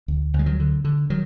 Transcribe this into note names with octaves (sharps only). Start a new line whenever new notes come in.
D2
D2
G#3
D#3 F#3
D3
D3
D#3 F#3